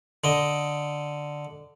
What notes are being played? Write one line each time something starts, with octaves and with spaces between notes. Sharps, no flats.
D3 D#5